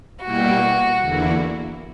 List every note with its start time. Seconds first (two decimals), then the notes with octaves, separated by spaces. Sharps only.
0.23 B2 G3 A#3 E4 F#4 G4
1.00 E2 D3 A#3 E4